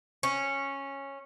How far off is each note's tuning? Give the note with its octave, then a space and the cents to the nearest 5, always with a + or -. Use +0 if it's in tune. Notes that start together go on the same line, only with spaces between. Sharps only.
C#4 -10